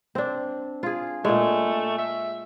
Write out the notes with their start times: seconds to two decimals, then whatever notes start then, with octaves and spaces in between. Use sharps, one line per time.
0.15 C4 D4
0.83 F4 G#4
1.25 A#2 G#3 A3
1.98 E5